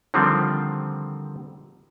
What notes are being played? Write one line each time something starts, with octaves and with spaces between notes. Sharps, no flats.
D3 D#3 F3 G3 C4